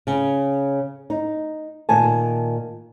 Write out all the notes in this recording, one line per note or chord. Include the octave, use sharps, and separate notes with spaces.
C#3
D#4
A#2 D#3 G#5 A5